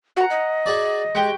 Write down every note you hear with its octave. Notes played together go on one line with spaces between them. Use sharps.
F#4 F#5 A#5
D#5
F#4 G#4 D5
G#3 F#4 G4 G5